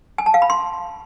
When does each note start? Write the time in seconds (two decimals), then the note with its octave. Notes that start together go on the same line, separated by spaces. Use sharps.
0.18 G#5
0.26 A5
0.34 F5
0.42 B5
0.50 C6